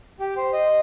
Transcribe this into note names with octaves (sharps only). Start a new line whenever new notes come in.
G4
C5
D#5